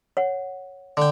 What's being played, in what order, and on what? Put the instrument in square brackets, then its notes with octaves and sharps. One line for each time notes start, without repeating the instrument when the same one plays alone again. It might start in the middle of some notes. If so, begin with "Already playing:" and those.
[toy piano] C#5 F#5
[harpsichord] D3 G5